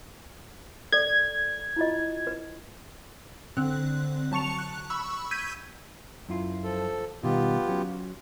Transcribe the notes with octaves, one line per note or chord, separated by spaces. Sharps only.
A4 D5 G#6
E4 F4 D#5
B4
D3 C4 F#6
F#3 A5 C#6 C#7 F7
F#6
B5 C#6 E6
E6 G6 G#6 B6 D#7
F#2 E4 F4
F3 A4
B2 D#3 G3 B3 F4 G4
F#3 C#4